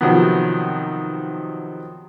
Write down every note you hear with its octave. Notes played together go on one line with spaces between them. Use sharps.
C3 D#3 F3 F#3 B3